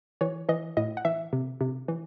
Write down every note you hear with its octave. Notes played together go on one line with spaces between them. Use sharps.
E3 C#5
E3 D#5
A2 D#5
F#5
E3 E5
C3
C3
E3